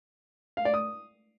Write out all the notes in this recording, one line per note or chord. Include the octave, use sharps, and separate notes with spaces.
F5
D5
D#6